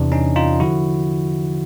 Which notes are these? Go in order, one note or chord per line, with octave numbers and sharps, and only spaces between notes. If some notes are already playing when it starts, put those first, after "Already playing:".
Already playing: E2 C3 E3 D4
C#4 D#4
D#4 F4
D3 F3 E4 F#4